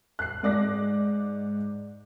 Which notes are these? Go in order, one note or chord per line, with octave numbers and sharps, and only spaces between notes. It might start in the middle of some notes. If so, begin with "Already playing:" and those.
F#6 C7
G#2 D5 D6 A#6